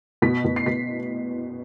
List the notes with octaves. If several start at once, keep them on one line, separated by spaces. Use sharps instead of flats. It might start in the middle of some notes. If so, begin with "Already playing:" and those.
B2 B6
B2
C7
B2 B6